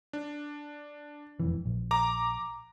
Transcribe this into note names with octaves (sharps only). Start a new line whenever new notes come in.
D4
E1 F2 E3
A#1
A#5 D6